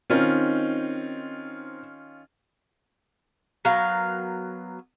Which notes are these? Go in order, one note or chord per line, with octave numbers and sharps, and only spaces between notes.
D#3 C4 C#4 D#4 F4
F#3 B3 A#4 F5